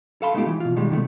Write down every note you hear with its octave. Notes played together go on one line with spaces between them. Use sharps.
A4 F5 A5 B5 C6
G#3 A3 B3 D#4 F4 G4
E3
B2 F4
B2 D#3 G3 G#3
C3 D#3 F#3 A3